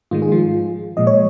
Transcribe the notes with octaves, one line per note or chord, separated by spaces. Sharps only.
G#2 D#3 G#3 F4
G#4
F3 F4
A#2 F3 G#3 D#5
C#5